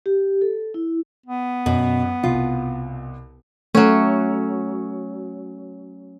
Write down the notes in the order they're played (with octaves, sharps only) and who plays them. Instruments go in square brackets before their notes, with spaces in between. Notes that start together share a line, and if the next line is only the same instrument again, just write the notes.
[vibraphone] G4
A4
E4
[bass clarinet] B3
[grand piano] F#2 [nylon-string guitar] B2
[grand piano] C2 B2 [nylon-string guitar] F4
[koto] F#3 C#4 [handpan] A3